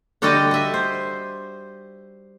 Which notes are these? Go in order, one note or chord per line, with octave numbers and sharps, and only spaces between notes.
D3 G3 F#4 D5 D#5 G5
D#5 E5
C5